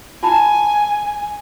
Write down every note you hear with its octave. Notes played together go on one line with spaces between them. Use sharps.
E4 G#5 A5 B5